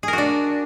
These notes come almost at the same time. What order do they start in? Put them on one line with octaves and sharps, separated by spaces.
G#4 A#4 F#4 D4